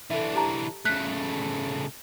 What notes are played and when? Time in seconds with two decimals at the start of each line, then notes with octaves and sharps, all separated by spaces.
0.10 E3 D4 A4 E5
0.35 G4 A5 A#5
0.85 C#3 A3 F#6 B6